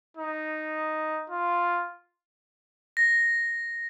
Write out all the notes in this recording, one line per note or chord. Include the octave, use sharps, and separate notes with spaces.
D#4
F4
A#6